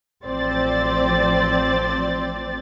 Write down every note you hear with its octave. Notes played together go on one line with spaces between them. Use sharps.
A1 F3 C4 C5 D5 A6